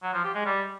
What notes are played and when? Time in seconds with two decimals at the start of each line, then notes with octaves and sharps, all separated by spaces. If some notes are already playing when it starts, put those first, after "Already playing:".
0.03 F#3
0.14 F3
0.24 G4
0.35 G#3
0.45 G3